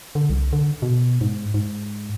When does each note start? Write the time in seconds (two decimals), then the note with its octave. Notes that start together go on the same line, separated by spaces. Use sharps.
0.15 D3
0.30 C2
0.53 D3
0.82 B2
1.21 G#2
1.54 G#2